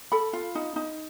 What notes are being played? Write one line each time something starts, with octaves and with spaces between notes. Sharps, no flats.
A4 B5
F4
D#4
D#4